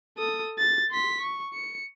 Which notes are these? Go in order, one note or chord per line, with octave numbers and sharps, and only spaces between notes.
A4 D#6
A6
C6 B6
C#6
C#7